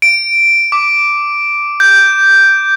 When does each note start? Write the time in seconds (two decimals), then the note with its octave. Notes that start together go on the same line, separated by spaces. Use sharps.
0.02 D7
0.72 D6
1.80 G6